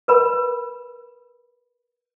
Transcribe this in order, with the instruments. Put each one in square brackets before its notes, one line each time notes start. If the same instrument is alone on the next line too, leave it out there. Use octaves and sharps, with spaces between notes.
[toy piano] A#4 B4 B5